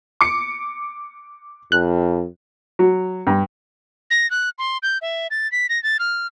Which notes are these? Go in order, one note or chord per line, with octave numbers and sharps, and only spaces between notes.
D6 C#7
F2 F#6
F#3
G2
A#6
F#6
C6
G6
E5
A6
B6
A#6
A6
F6